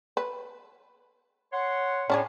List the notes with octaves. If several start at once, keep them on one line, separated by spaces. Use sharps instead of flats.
B4
C#5 F#5 C6
A2 C#4 D4 G#4